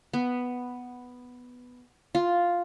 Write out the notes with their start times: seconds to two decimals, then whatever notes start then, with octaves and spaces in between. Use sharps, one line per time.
0.13 B3
2.15 F4